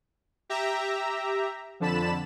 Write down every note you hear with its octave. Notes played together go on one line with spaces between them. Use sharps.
G4 E5 A#5
F2 D3 A5 B5 E7